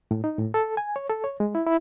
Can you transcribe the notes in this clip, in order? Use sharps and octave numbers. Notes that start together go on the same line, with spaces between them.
A2
D#4
A2
A4
G#5
C#5
A4
C#5
G#3
E4
E4